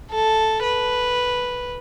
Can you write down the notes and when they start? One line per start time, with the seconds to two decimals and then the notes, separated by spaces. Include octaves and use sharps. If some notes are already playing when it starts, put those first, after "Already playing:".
0.11 A4
0.63 B4